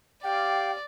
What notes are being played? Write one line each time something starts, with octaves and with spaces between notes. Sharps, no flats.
G4 D5 F5 G5